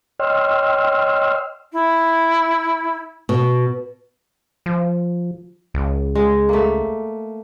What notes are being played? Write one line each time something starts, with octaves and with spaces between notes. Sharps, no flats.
C#5 D#5 G5 C6 E6 F6
E4
B2
F3
C#2
G#3
A3 A#3